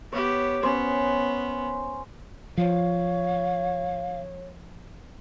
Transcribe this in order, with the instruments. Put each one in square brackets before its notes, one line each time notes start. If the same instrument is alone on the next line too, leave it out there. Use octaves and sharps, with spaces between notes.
[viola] B3 G4 [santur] C#5
[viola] B3 [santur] C#4 C5
[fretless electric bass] F3 [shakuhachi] C#5 [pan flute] F5